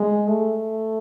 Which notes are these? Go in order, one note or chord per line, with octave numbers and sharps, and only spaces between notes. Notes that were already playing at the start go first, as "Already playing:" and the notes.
Already playing: G#3
A3